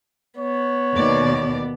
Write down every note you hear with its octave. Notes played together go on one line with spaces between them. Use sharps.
B3 C#5
D#2 B2 D5